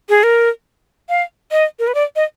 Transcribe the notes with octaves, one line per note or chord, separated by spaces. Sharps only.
G#4
A#4
F5
D#5
A#4
B4
D5
D#5